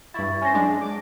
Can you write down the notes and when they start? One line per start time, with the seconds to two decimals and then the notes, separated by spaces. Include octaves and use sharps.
0.14 G2 E4 E5 C#6 A6
0.42 C#4 C5 G#5 A#6
0.54 F#3 G#3 D4
0.81 D6